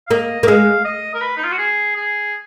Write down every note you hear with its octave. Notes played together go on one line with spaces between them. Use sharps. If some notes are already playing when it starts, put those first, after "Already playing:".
F5
A#3 D#5
A#3
G#3 F5
D#5
A#4
B4
D#4
F4
F#4
G#4
G#4